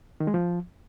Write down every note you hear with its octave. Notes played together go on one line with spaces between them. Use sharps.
D#3
G#3
F3